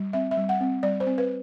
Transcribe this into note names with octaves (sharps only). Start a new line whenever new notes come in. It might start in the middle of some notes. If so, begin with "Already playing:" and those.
Already playing: G3
C4 E5
E5
G3
F#5
C4
G3 D5
C5
C4
B4